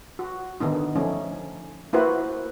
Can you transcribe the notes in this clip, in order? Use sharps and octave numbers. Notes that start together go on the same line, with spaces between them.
F#4
D3 D#3 B3 D#4
F3 A3 C#4 D#4
A#3 E4 F#4 B4 C5